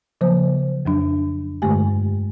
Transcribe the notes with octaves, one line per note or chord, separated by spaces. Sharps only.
C#3 F3 F#3 A#3 C5
F2 F#3 D4
G2 D3 G#3 A3 G4 G#5